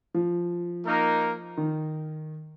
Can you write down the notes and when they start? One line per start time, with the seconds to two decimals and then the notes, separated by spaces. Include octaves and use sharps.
0.14 F3
0.86 A#3 D#4 A#4
1.57 D#3